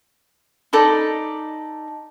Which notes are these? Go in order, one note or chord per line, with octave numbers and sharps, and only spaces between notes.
D#4 A4 D5 B5